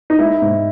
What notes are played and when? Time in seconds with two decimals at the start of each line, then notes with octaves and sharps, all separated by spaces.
0.10 D#4
0.19 G#3 E4
0.41 G#2